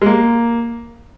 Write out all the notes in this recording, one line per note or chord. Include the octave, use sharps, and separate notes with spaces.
G#3
A#3